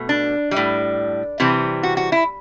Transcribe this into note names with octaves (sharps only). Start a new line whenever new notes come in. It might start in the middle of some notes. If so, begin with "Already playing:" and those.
Already playing: B2 A3
D4
G3
A2
C3 E3 G3
F#4
F#4
E4